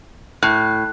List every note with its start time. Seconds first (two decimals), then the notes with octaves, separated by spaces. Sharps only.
0.43 A2 F#6